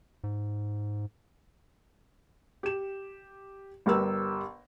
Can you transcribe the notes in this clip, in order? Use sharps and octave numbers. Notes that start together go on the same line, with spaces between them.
G#2
G4 E7
G1 G3 A#4 B4 E6